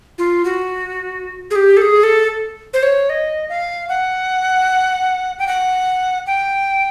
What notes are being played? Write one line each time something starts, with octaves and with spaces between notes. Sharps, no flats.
F4
F#4
G#4
G4
A4
G#4
A4
C5
C#5
D#5
F5
F#5
G5
F#5
G5